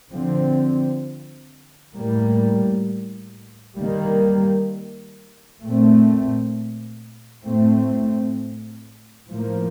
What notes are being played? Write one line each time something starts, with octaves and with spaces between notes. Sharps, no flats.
D3 F3 C4
A2 G3 A#3
D#3 G3 A#3
A#2 A3 C4
A2 A3 C4
A2 F3 A#3